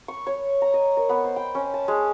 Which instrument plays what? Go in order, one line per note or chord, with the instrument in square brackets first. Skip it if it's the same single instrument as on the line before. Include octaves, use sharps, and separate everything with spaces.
[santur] C#6
C#5
A#5
D#5
A#4
B3
C5
G5
C#4
A5
G#3